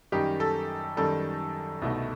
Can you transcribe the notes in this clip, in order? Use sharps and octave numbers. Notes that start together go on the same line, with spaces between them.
F#2 D#3 G3 D#4 G4
A4
F#2 D#3 G3 D#4 A4
C2 B2 A3 D#4